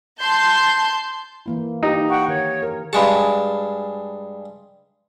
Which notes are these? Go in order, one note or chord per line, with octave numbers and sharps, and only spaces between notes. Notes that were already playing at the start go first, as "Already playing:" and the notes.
A5 C6 G6
E3 A#3 E4
D#4 G4
F#5 G5 C#6
D#3 C#5
A#4
G2 G#3 G#4 G#5 A5 B5